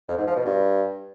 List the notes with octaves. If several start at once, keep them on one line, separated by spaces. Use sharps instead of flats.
F2
G#2
F3
B2
G2